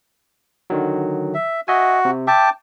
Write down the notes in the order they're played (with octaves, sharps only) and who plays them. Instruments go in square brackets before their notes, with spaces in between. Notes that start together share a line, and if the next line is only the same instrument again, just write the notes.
[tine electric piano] D3 D#3 F#3
[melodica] E5
[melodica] F#4 [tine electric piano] D#5 E5 G#5
[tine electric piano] C3
[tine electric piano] E5 [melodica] G5 A5 D6